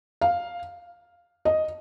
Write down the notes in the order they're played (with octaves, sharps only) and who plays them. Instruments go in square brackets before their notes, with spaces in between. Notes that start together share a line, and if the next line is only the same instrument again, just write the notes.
[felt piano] F5
D#5